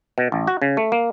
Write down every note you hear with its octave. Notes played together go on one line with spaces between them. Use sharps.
B2
A1
F#4
C#3
A3
A#3